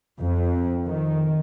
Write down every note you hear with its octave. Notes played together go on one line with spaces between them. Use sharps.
F2
D#3